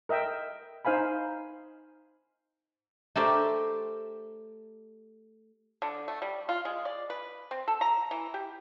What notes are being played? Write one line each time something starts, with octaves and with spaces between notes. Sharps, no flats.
A#4 D#5 E5 G5
D#4 C5 F5 G#5 B5
A3 G4 A#4 C5 D5 E5
D3
A3
G3
F4
G#3
D5
B4
C4
A4
A#5
E3
G4